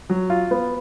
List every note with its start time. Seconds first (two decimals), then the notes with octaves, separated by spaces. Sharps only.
0.10 F#3
0.30 F4
0.51 B3